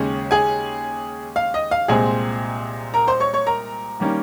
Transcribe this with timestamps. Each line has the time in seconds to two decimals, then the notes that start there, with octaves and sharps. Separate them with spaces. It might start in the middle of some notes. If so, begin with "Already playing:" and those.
Already playing: D#2 C#3 G#3 C#4 G#4
0.31 G#4 G#5
1.36 F5
1.54 D#5
1.71 F5
1.88 C2 A#2 G#3 C4 G#4 G#5
2.94 A#4 A#5
3.07 C5 C6
3.20 C#5 C#6
3.34 C#5 C#6
3.47 A#4 A#5
4.00 D#3 G3 A#3 C#4